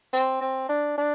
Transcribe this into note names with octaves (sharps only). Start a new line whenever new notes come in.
C4
C4
D4
D4